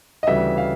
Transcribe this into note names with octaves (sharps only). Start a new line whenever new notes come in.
D#5
D2 C#3 E3 G3 E5
F5